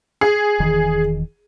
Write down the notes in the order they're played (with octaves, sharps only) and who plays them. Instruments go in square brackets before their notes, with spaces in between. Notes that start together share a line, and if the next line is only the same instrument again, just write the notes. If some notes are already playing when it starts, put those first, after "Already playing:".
[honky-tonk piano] G#4
[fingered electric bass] E1 D#3 E3